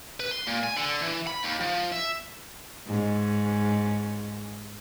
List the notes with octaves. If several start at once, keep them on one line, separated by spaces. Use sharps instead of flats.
B4
C6
A#2
G#5
D3
E3
B5
D#2
F3
E5
G#2 C#4